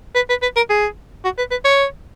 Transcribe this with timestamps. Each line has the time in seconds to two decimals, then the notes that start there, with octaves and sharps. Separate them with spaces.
0.16 B4
0.30 B4
0.42 B4
0.56 A#4
0.70 G#4
1.24 F#4
1.38 B4
1.51 B4
1.64 C#5